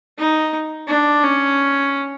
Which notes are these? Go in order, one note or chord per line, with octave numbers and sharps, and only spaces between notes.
D#4
D4
C#4